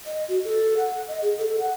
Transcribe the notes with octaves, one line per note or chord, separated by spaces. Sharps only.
D#5
F#4
A4
F#5
D#5
G#4
A4
F#5